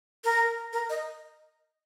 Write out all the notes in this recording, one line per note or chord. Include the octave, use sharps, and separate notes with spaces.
A#4
A#4
D#5